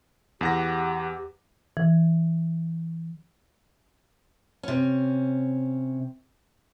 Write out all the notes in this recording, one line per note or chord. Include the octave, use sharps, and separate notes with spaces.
E2 G4 F#5 A#6
E3
C3 C#4